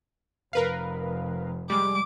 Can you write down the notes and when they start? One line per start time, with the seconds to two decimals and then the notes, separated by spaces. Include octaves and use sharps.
0.53 F1 A#4 B4 F5
1.70 G3 G#3 D6